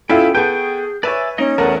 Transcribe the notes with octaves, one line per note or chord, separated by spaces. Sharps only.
B3 C#4 E4 F4 A4 G5
B3 G#4 A4 B4 G5 C#6 G6
B4 C#5 D5 E5 G#5
A#3 C#4 D#4 D#5
E2 E3 A3 B3 A#4 F#5 A5